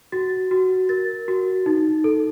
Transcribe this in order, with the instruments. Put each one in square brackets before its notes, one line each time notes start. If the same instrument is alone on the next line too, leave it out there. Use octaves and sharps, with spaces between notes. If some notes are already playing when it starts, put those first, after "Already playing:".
[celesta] F#4 A6
F#4
A#4 A6
F#4
D#4
A4